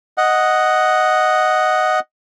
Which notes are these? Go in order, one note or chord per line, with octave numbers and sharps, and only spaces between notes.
D#5 F#5